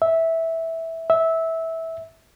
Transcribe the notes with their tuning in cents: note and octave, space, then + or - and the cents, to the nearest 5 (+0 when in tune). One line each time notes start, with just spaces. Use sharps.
E5 -10
E5 -15